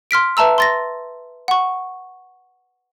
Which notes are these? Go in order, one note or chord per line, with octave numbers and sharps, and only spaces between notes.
C6 F6 B6 D7
B4 E5 A5 A#5 E6
C6 A6 A#6
F#5 C#6